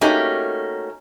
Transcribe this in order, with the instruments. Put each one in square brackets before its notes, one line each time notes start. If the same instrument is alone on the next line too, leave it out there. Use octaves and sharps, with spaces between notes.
[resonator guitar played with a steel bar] A3 A#3 C#4 D#4 F#4 G4